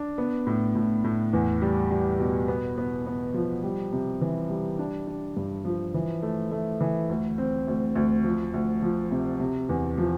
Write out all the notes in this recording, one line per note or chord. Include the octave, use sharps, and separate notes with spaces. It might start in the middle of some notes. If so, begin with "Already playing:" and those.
Already playing: D4
B3
A2
A2
A2
E2
G3
G3
B2
B3
B3
B3
F3
G3
C3
E3
G3
D4
D4
G2
F3
E3
A3
A3
E3
D2
C4
D2
D2
F3
D2
F3
C3
C3
E2
F3